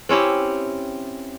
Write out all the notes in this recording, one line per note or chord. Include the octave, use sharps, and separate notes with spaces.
C4 C#4 E4 G4